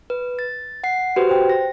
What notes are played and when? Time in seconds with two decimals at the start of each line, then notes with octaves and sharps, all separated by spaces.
0.10 B4
0.39 A6
0.84 F#5 C7
1.16 F#4 G4 B4 C5
1.29 C5 G5
1.49 A#6